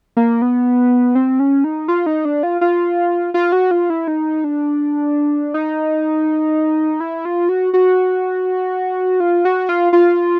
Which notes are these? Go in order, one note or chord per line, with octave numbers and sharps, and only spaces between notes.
A#3
B3
C4
C#4
D#4
F4
D#4
D4
F4
F4
F4
F#4
F4
E4
D#4
D4
D#4
E4
F4
F#4
F#4
F4
F#4
F4
F4